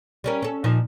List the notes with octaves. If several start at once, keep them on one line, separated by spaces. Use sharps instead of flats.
G3 C#4 A#4
C#4 A4
A#2 F3 D#4